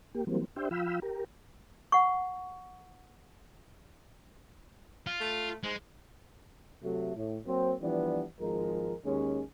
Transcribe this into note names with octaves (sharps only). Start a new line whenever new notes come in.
A#3 G4
E3 F#3 G3 A#3 C4
D4 G4 C5 E5 G5
F3 F4 F5 G5 B5 E6
G4 A#4
F#5 C#6
F4
A3
G#2 G#3
C3 F#3 A3
A2
F#3 A#3 C4
E3 F3 G3 B3 D4
G#1 F3 G#3 A#4
D#2 G#3 C#4